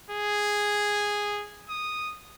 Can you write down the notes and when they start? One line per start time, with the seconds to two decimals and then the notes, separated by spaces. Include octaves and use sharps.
0.11 G#4
1.69 D#6